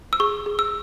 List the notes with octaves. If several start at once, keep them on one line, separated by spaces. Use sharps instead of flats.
E6
G#4 C#6
G#4
E6